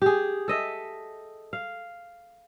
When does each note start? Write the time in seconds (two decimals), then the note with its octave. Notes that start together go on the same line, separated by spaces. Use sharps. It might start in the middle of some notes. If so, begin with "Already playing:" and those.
0.02 G4 G#4
0.48 A4 D#5 E5
1.53 F5